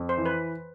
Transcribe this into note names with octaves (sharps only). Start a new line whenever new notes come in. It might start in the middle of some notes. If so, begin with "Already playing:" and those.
Already playing: F2
C5
E3
B4